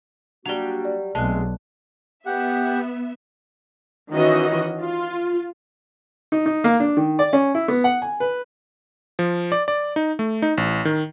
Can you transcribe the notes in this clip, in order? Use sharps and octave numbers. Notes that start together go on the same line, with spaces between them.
F#3 G3 A#3 D4 F#4 F7 G7
D5
B1 G#3 A3 C4 A5 F#6
B3 G4 E5 F#5
D#3 E3 C#4 F#4 D#5
F4
D#4
D#4
A#3
D4
D#3
D5
C#4
E4
B3
F#5
G#5
B4
F3
D5
D5
D#4
A3
D#4
A1
D#3